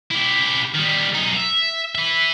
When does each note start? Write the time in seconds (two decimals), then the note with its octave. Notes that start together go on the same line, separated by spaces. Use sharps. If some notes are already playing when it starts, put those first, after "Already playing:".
0.11 E4 G4
0.74 D#3 G3
1.15 F#2 D#4
1.37 E5
1.95 B4 E5